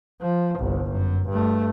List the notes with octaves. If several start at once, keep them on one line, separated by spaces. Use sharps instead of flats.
F3
G1 C2
F#2
G2 A3